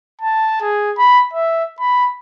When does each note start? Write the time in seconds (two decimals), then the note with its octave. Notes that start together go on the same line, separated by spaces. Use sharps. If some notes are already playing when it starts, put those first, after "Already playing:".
0.21 A5
0.62 G#4
0.98 B5
1.34 E5
1.80 B5